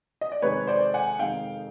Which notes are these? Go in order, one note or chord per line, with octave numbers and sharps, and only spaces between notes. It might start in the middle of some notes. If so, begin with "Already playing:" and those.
D#5
D5
F2 C3 D#3 G#3 B4 C#5
C5 D5
F#5 G#5
F2 C3 D#3 G#3 F5 G5